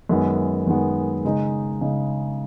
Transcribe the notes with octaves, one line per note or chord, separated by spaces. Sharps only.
F#2 D#3 G#3 B3
F#2 D#3 G#3 B3
C#3 G#3 D#4
C#3 G#3 D#4